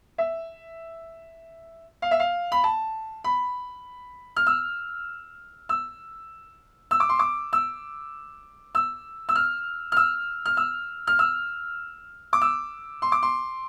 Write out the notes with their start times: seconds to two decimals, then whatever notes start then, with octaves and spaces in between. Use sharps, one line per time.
0.18 E5
2.02 F5
2.11 E5
2.20 F5
2.52 B5
2.64 A5
3.24 B5
4.36 F6
4.47 E6
5.69 E6
6.91 E6
7.00 D6
7.09 C6
7.19 D6
7.53 E6
8.75 E6
9.29 E6
9.35 F6
9.92 F6
9.97 E6
10.45 F6
10.57 E6
11.07 F6
11.19 E6
12.33 D6
12.42 E6
13.02 C6
13.12 D6
13.23 C6